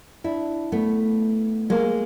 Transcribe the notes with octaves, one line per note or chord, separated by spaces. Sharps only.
D4 E4
A3 B3
G#3 A#3